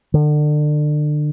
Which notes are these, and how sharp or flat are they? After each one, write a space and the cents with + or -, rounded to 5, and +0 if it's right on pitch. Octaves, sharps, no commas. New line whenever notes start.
D3 +30